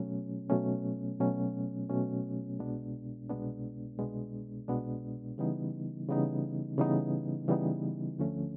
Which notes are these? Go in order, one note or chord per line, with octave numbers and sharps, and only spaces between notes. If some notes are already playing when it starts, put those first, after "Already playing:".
Already playing: B2 F#3 A3 C#4
B2 F#3 A3 C#4
B2 F#3 A3 C#4
B2 F#3 A3 C#4
C2 B2 G#3 B3 D4
C2 B2 G#3 B3 D4
C2 B2 G#3 B3 D4
C2 B2 G#3 B3 D4
C#3 E3 G3 B3 D#4
C#3 E3 G3 B3 D#4
C#3 E3 G3 B3 D#4
C#3 E3 G3 B3 D#4
D2 D3 F3 A3 C#4